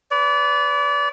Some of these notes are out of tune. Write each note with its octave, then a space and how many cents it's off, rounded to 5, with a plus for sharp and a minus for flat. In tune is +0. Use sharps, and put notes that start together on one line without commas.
B4 +15 D5 -30